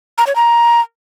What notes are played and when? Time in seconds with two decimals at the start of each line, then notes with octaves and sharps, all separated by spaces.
0.18 A#5
0.27 C#5
0.36 A#5